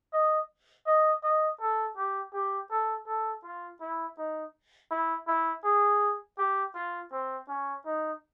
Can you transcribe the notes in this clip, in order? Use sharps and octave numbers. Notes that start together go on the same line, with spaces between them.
D#5
D#5
D#5
A4
G4
G4
A4
A4
F4
E4
D#4
E4
E4
G#4
G4
F4
C4
C#4
D#4